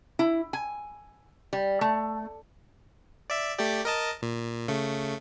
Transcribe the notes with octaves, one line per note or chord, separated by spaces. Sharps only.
E4
G#5
G3
A3
D5 E5
A3 G4 D5
A#4 D#5 A5
A#2
C#3 A3